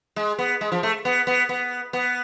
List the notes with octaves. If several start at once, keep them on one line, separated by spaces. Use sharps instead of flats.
G#3
B3
G#3
F3
A3
B3
B3
B3
B3